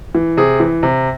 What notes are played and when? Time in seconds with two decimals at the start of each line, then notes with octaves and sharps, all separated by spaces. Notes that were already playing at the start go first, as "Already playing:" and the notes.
0.15 E3
0.37 C3 G#4
0.60 E3
0.83 C3